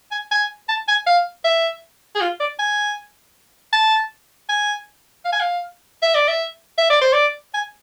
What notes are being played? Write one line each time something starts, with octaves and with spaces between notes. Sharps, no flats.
G#5
G#5
A5
G#5
F5
E5
G#4
F4
D5
G#5
A5
G#5
F5
G#5
F5
E5
D5
E5
E5
D5
C5
D5
G#5